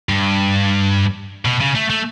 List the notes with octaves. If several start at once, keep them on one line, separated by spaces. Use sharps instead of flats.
G2
B2
C#3
A3
A3